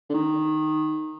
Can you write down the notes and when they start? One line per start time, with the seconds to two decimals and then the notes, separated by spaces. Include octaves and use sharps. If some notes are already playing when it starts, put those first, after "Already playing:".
0.09 D3
0.14 D#3